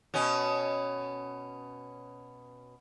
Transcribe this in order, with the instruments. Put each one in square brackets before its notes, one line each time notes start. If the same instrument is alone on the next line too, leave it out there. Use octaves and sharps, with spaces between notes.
[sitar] B2 C#4